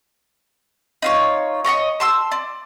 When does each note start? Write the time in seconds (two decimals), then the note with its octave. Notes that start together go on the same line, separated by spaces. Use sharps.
1.02 D#4 F4 C#5
1.65 C#5 D#5 A#5 C#6
2.00 A5 C6 E6
2.32 D5